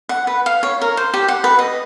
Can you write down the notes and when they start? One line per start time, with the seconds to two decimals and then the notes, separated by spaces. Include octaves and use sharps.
0.09 F#5
0.27 B4
0.46 F5
0.63 C#5
0.82 A#4
0.97 C5
1.14 G4
1.28 F#5
1.44 B4
1.59 D#5